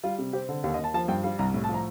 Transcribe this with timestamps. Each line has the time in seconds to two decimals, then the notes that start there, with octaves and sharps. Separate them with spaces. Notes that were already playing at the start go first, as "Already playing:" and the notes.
0.04 G3 F4
0.19 C3
0.33 C4 G4
0.49 D3
0.64 D#2 G4
0.74 D#5
0.79 D#2
0.84 A5
0.94 F3 A5
1.08 G2 G5
1.23 G3 F5
1.39 C2 A#5
1.54 A2
1.64 A5
1.69 F3
1.74 A#5